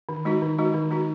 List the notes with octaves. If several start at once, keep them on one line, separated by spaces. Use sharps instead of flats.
D#3
G#3 D#4 F#4
D#3
G#3 D#4 F#4
D#3
G#3 D#4 F#4